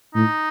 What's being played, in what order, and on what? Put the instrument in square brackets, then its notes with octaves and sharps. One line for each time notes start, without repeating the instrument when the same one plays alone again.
[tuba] A2 [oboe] D#4